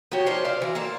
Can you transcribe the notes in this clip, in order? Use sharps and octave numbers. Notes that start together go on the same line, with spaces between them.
F3 D#4 F#4 G4 C#5
F3 G#3 C5 D5 F5 A5
C#3 C5 D5 F5
E3 F#3
A#3 A4 C5 F5